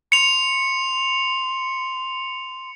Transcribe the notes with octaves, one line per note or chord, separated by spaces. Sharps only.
C6 C#7 F7